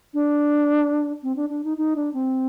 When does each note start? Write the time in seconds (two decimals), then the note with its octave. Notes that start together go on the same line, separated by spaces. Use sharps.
0.14 D4
1.23 C4
1.36 D4
1.49 D4
1.64 D#4
1.77 D#4
1.96 D4
2.13 C4